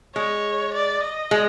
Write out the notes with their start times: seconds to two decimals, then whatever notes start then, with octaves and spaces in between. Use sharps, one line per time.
0.15 G#3 C#5
0.73 D5
1.03 D#5
1.31 G#3